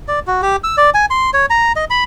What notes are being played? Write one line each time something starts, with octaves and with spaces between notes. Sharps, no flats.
D5
F#4
G4
E6
D5
G#5
C6
C#5
A#5
D#5
B5